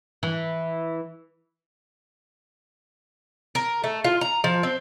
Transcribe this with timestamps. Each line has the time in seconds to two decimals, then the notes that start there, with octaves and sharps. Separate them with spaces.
0.23 E3
3.55 A#4
3.84 A3
4.04 F4
4.21 A#5
4.44 F3
4.63 C4